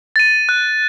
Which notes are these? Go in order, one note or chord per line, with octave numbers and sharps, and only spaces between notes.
A6 D#7
F#6